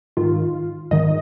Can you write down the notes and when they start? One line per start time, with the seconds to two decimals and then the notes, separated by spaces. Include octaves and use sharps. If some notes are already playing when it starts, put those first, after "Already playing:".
0.17 G#2 D#3 F4
0.91 G#2 D#3 D#5